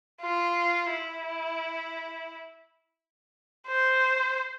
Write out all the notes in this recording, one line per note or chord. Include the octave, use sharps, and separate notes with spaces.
F4
E4
C5